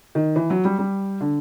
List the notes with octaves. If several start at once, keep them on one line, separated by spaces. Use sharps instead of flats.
D#3
E3
F#3
G3
G3
D3